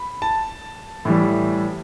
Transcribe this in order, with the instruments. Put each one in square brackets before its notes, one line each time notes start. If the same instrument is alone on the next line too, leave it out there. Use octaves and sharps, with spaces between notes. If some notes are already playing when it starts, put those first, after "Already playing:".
Already playing: [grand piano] B5
A5
A2 E3 G3